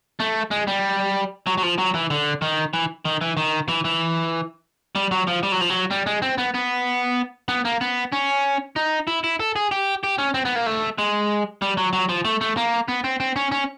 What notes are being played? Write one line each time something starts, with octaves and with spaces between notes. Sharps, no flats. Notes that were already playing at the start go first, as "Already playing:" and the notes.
A3
G#3
G3
F#3
F#3
F3
F#3
E3
D3
D#3
E3
D#3
E3
D#3
E3
E3
G3
F#3
F3
G3
F#3
F3
F#3
G3
G#3
C4
B3
B3
B3
A#3
B3
C#4
D#4
E4
E4
A4
G#4
G4
G4
C#4
C4
B3
A#3
A3
G#3
G3
F#3
F#3
F3
A3
A3
A#3
B3
C4
C4
C#4
C#4